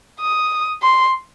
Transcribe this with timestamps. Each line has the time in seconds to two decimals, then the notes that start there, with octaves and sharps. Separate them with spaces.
0.21 D#6
0.83 C6